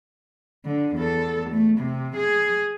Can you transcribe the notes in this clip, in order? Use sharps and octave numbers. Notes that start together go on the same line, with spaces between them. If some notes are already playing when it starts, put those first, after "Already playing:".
D3
E2 A4
A3
C3
G#4